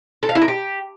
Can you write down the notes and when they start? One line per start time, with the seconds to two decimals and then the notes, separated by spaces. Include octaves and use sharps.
0.23 A4
0.29 F5
0.35 E4
0.42 A#4
0.48 G4